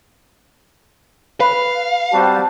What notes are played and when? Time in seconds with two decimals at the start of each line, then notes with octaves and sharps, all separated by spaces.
1.40 B4 F5
2.12 G3 C4 F#4 A5